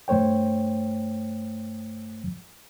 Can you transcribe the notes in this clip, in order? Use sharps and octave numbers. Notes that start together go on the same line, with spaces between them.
G2 A3 C5 C#5 G5